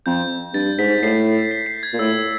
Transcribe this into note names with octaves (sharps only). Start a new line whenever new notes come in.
F2 G6
G2 A6
G#2 B6
A2 C7
B6
C7
G#6
A#2
A2 E6